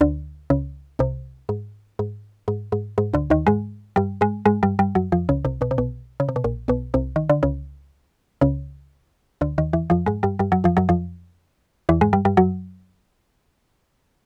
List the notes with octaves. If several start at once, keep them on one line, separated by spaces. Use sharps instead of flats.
D2 D3
C#2 C#3
C2 C3
G#2
G#2
G#2
G#2
G#2
D2 D3
D#2 D#3
G#2 G#3
G2 G3
G#2 G#3
G#2 G#3
G2 G3
G2 G3
F#2 F#3
F2 F3
C#2 C#3
C2 C3
B1 B2
C3
B1 B2
C#3
C3
B2
A#1 A#2
B1 B2
C2 C3
D#3
D3
C#2 C#3
C#2 C#3
D2 D3
D#2 D#3
E2 E3
F2 F3
G#2 G#3
G2 G3
G2 G3
F#2 F#3
F2 F3
F#2 F#3
F2 F3
E2 E3
G#2 G#3
G2 G3
G2 G3
F#2 F#3